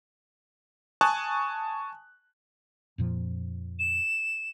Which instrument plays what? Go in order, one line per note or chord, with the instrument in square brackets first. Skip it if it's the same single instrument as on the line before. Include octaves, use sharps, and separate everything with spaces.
[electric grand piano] G#5 A5 C#6 D#6 F#6
[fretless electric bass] F2 A#2 F3
[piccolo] E7